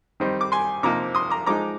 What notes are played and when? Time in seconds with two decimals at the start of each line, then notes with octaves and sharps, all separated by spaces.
0.20 D#3 G3 C4 D#4
0.41 D6
0.52 G#5 C6
0.83 C3 F3 A#3 D#4 A#5 D6
1.15 C6 D#6
1.30 A#5 D6
1.46 F3 G#3 D#4 A#5 D6